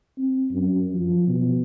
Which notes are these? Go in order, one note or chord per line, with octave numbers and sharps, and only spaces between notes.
C4
F#2
F3
B2